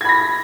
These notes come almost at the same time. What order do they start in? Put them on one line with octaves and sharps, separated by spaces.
G#6 B5 A#6